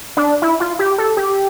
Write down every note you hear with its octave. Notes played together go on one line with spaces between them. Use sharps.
D4
E4
F4
G4
A4
G4